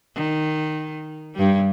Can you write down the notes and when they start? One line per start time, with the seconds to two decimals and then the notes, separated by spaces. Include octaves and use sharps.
0.15 D#3
1.35 G2 G3